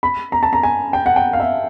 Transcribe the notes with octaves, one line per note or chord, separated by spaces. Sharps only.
B5
A#5
A5
A#5
G#5
G5
F#5
G5
F5
E5